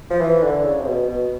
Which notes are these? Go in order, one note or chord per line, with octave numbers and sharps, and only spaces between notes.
F3
E3
D3
C#3
C3
B2
B2